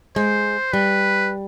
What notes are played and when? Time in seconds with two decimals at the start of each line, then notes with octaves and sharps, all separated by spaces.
0.16 G#3 C5
0.73 G3 B4